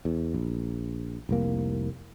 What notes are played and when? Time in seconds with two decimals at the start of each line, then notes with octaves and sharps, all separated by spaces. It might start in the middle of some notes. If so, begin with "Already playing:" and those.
0.05 E2
0.34 A#1
1.29 F1 C2 A#3